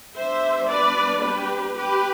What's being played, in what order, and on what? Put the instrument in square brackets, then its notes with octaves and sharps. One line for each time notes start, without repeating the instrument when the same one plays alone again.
[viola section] G3 B3 D4 C5 E5
B4 D5
G4 B4
G4 B4